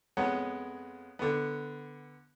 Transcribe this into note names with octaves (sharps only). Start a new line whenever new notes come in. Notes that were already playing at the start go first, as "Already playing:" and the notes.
F2 G#3 B3 C#5 F#5
D3 B3